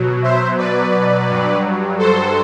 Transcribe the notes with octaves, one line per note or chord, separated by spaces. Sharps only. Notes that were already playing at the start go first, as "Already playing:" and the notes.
Already playing: B2 F#3
C5 E5
B4 D5
G2 F#3
A4 C5